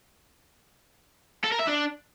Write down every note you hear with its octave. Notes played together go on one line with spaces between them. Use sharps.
A4
A#4
E5
D4